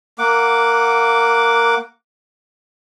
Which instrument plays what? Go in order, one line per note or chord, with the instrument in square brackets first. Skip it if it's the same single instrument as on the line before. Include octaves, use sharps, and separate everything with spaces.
[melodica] A#3 F#5 D6